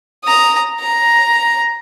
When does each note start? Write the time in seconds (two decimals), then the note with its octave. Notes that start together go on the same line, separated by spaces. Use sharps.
0.24 A#5 D#6
0.80 A#5